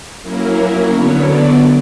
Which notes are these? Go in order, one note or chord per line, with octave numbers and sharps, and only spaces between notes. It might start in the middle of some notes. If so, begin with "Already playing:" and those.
F#3 A#3 C#4 E4 A#4
D3 F#3 B3 C#5
D5